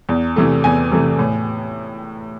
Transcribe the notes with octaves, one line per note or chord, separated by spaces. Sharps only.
E2
C3 E3 A3
E2 G#5
C3 E3 A3
A2